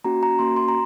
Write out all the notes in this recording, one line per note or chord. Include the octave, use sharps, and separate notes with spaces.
A#3 C#4 F#4 A#5
A#5
A#3 C#4 F#4 C6
C6
A#5